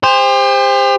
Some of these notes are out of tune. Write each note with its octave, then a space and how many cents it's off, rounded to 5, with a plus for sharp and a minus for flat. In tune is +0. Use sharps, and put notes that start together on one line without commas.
G4 +40 C5 +0